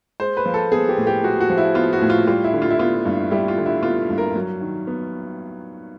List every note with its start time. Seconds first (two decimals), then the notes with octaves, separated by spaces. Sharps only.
0.20 G#3 C5
0.37 B4
0.46 F3
0.54 A4
0.72 B3 G#4
0.89 G4
0.97 A2
1.07 G4
1.23 G#3 F#4
1.41 F#4
1.50 F3
1.58 E4
1.75 B3 F4
1.93 F#4
2.01 A2
2.10 F4
2.27 G3 F4
2.44 E4
2.53 D3
2.62 F4
2.70 E4
2.79 B3 F4
3.05 G2
3.31 G3 E4
3.48 F4
3.57 D3
3.66 E4
3.83 B3 F4
4.09 G2
4.18 A#4
4.35 F#3
4.61 D#3
4.87 B3